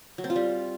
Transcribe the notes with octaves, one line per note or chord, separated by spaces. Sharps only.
F#3
C4
F4
G3